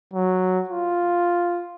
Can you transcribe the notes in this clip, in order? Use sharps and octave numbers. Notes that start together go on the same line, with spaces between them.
F#3
F4